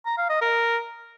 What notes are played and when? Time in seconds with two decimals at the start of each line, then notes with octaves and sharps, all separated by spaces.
0.06 A#5
0.18 F5
0.30 D#5
0.42 A#4